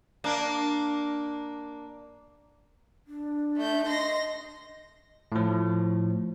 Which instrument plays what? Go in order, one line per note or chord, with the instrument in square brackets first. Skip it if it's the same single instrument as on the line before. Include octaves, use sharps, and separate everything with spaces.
[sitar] A#3 D4
[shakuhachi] D4
[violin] A3 G6
[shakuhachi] D#5 [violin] C6 A#6
[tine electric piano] A2 F3